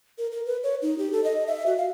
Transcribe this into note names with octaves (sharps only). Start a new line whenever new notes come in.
A#4
A#4
B4
C#5
D#4
G4
A4
D#5
E5
F#4
F5